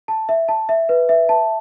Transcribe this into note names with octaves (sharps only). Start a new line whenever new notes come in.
A5
E5
A5
E5
B4
E5
A5